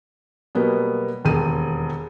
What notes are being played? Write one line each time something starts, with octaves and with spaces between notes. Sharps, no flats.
B2 F#3 G3 A#3 B3
E1 D#2 G#4 D#7